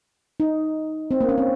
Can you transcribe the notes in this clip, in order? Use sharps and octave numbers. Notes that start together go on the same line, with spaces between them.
D#4
C4
A#3
C#4
C4